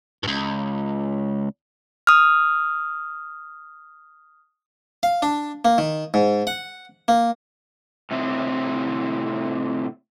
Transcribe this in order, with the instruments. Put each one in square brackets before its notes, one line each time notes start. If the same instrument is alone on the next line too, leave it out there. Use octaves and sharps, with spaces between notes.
[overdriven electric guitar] C#2 G2
[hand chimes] D#6 F6
[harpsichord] F5
D4
A#3
D#3
G#2
F#5
A#3
[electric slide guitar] A2 C3 F#3 C4 E4 G#4